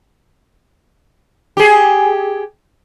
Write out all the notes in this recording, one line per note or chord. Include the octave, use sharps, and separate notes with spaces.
G4 G#4